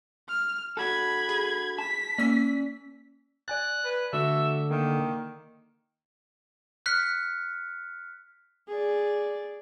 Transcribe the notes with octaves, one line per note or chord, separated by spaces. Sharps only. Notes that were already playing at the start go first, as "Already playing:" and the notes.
F6
D4 F#4 A4 B5 G#6
G#4
A5 B6
A#3 C#4 D5 E6
D5 G#5 F#6 A6
B4
D3 A3 F#4 A4 E5
D#3 A#3
F6 F#6 B6 C#7
G#4 D5